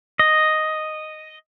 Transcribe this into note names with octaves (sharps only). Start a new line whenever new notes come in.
D#5